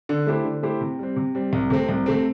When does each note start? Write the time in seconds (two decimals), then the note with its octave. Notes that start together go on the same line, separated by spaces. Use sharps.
0.09 D3
0.27 A3 E4 G4 C5
0.44 D3
0.63 A3 E4 G4 C5
0.81 C3
0.99 G3 C4
1.16 C3
1.35 G3 C4
1.53 C2
1.70 C3 A3 C4
1.89 C2
2.06 C3 A3 C4